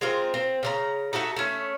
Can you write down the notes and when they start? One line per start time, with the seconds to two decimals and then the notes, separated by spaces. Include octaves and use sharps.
0.01 G#3 C4 F4 A#4
0.34 C4
0.63 C#3 A4 A#5
1.13 D#4 F#4 A4 E5
1.36 A3 C#4